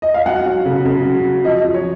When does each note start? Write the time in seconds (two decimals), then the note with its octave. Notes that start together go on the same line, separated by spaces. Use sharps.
0.02 D#5
0.14 F5
0.26 F#3 F#5
0.46 F#3
0.65 C#3
0.85 C#3
1.05 F#3
1.25 F#3
1.44 F3 D#5
1.65 F3
1.74 C#5